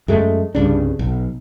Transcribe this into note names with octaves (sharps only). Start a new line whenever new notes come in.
F#2 G#3 A3
C2 G2 C#3 D4
B1